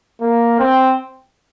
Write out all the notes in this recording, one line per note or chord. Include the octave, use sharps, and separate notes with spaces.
A#3
C4